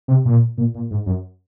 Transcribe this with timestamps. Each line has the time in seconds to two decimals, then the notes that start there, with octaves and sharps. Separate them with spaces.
0.08 C3
0.25 A#2
0.58 A#2
0.75 A#2
0.91 G#2
1.06 F#2